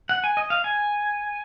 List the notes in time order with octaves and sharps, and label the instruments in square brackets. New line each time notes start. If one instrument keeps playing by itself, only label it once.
[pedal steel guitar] F#5
G#5
D#5
F5
G#5